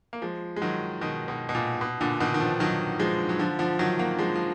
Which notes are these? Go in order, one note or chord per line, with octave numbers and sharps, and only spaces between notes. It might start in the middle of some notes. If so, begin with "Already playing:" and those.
A#3
F3 G#3
G#3
D#3 F#3
B2 D#3
B2
B2
A#2
B2
A#2 D3
B2 D#3
D#3
D3 F3
D#3 F#3
F3 G#3
F#3
D3 F3
D3 F3
D#3 F#3
F#3 A#3
F3 G#3
F3